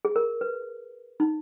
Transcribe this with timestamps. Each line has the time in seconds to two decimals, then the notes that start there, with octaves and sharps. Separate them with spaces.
0.05 G#4
0.16 A#4
0.41 B4
1.20 D#4